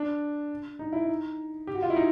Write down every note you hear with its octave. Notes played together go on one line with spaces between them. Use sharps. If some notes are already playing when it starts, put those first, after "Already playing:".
Already playing: D4
D#4
E4
D#4
G4
F#4
F4
E4
D#4